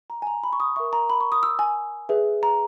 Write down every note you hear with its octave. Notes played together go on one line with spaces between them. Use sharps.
A#5
G#5
A#5
B5
C#6
D#6
A#4 E5 C#6
A#5
B5
C#6
D#6
E6
G#5
G#4 B4 E5
A#5